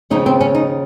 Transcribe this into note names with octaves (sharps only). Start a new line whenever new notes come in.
D#2 C#3 F3 D#4
C4
C#4
D#4